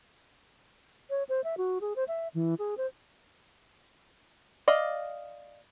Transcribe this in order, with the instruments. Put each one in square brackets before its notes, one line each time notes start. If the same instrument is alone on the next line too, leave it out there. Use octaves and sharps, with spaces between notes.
[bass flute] C#5
C5
E5
F#4
G#4
C5
E5
E3
G#4
C5
[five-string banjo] D5 D#5 F5